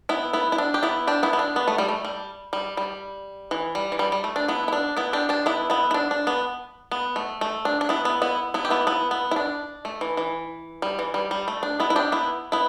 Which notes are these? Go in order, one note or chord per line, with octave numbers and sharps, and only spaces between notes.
B3 E4
B3 E4
E4
D4
G4
B3 E4
D4 G4
B3 E4
B3
D4
B3
A3
G3
A3
G3
G3
G3
E3
G3
E3
G3
G3
A3
D4
B3 E4
E4
D4
B3 E4
D4 G4
D4 G4
B3 E4
B3 E4
E4
D4
D4
B3
B3
A3
A3
D4
D4
B3 E4
B3
B3 E4
B3 E4
G4
B3 E4
B3 E4
B3
E4
D4
A3
E3
E3
G3
E3
G3
G3
A3
D4
B3 E4
E4
D4 G4
B3 E4
B3 E4